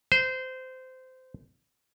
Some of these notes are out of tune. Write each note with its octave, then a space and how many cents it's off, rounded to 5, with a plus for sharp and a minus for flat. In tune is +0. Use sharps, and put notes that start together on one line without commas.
C5 -20